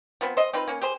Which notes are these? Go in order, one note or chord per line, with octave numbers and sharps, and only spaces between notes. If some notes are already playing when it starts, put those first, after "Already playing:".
F3 B3 C4
C5 D#5
C4 D#4 F4 B4
A#3 C#4
G4 G#4 C5